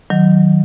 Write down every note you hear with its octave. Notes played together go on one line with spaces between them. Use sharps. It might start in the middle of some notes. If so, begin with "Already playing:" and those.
D#3 F#3